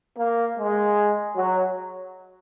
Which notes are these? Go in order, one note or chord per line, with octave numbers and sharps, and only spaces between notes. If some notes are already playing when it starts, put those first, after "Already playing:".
A#3
G#3
F#3